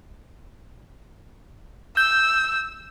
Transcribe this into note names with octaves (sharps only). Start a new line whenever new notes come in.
E6 G6